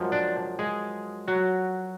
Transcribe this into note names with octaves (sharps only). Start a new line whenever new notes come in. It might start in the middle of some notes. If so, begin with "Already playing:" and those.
Already playing: F#2 F3 G#3
D4 D5
G#3 G#4
F#3 F#4